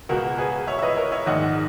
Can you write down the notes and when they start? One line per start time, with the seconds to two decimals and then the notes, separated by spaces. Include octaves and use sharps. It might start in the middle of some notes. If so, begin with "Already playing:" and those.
0.09 C#2 B2 F#4 A#4
0.38 G#4 B4
0.67 C#5 E5
0.78 E5
0.82 B4 D#5
0.97 A#4 C#5
1.12 C#5 E5
1.26 A#1 G#2 D#3 D#5 F#5